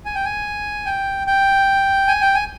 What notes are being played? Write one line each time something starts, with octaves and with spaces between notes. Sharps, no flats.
G#5
G5
G#5
G5
G5
G#5
G5
G#5